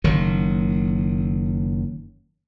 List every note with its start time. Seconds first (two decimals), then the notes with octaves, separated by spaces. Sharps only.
0.04 F#1 D#3 F#3